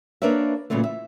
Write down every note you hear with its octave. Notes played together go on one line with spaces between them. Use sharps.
A#3 D4 A#4 B4 C#5 E5
A#2 C#3 E3 F#3 A3
E5